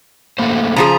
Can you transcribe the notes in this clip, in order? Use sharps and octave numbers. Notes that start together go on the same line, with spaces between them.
A3 A#3 C5
C#3 F3 G#4 A#5